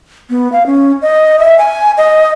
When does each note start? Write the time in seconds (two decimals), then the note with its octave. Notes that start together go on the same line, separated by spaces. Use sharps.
0.30 B3
0.52 F5
0.66 C#4
1.02 D#5
1.39 E5
1.58 G#5
1.97 D#5